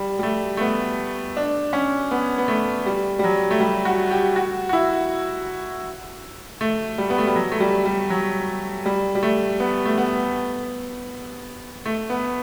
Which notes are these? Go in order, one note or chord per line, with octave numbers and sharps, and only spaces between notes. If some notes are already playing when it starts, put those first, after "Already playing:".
Already playing: G3
G3
A3
A3
B3
D4
C#4
B3
B3
A3
G3
G3
F#3
A3
G3
F#4
G4
F#4
F#4
E4
A3
G3
B3
A3
G3
F#3
A3
G3
G3
F#3
G3
G3
A3
B3
A3
B3
A3
B3